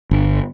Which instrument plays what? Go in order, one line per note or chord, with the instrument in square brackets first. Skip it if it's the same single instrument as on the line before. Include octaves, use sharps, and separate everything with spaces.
[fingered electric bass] G1